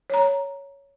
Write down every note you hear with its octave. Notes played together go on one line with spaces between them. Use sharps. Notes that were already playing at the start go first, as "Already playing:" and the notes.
C#5 A#5